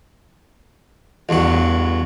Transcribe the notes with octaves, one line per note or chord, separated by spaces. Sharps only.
A1 E2 G2 F#4